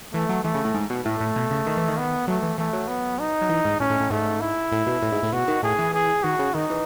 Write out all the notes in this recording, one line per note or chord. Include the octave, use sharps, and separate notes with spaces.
E3 A3
F#3
E3 A3
C#3
A2
G#2
B2
A2 A3
A2
B2
C#3
D#3
E3
D#3
B3
F#3 A3
E3
E3 A3
F#3
B3
D#4
F#3
E3
G#2
A2 C#4
A2
A2
G#2 A3
E4
A2
B2
A2
G#2
A2
B2 F#4
D#3
A2 G#4
E3
G#4
D#3 F#4
C#3
D#3 D#4
E3